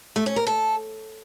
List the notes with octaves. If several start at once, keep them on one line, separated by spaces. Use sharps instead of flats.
A3
C#4
A#4
A4